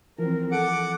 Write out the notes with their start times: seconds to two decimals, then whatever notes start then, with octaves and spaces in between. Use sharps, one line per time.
0.18 E3 F3 C4 A#4
0.51 A4 F#5 D6